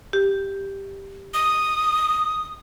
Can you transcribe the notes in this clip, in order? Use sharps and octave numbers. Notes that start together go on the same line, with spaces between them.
G4
D#6